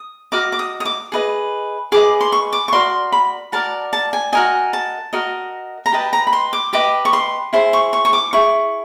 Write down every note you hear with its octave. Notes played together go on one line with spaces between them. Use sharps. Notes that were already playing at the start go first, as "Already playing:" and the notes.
Already playing: D#6
F#4 A#4 D#5 D6
D6
D#6
D#6
D6
G#4 B4 D#5
G#4 B4 D#5 D6
C6
C#6
D6
C#6
F#4 A#4 D5 C6
B5
F#4 A#4 D5 A5
A5
G#5
F#4 A#4 D#5 G#5
A5
F#4 A#4 D#5
A#5
G4 B4 D#5 A5
A#5
B5
C6
D6
G4 B4 D#5 D6
C#6
C6
E4 G#4 C5 C6
C#6
C#6
C#6
D6
E4 G#4 C#6